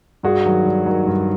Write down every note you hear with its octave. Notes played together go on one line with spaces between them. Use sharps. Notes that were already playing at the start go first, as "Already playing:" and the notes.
G2 F#4 G#4
D#3 F#3
G2
D#3 F#3
G2